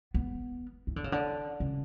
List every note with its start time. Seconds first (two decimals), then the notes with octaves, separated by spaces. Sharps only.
0.14 B3
0.87 E3
0.96 D3
1.04 C#3
1.12 D3
1.60 C#3